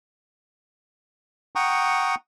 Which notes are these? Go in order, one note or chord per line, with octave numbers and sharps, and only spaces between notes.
F#5 G5 A#5 C#6 D#6